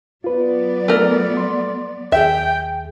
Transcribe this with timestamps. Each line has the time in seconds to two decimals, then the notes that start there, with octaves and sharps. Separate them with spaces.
0.24 F#3 B3 F4 B4 D5
0.88 A3 A#4
1.37 C6
2.12 D#2 G#4 E5 G5